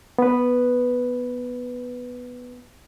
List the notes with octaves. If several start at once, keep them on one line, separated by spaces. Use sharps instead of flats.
B3 B4